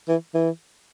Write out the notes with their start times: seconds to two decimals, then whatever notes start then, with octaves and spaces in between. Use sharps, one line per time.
0.09 E3
0.35 E3